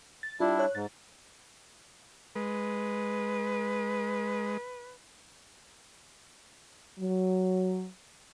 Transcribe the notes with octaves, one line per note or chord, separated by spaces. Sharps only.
A6
G3 D4 E4 F4
C#5 F#6
G#2 A6
G#3 B4
F#3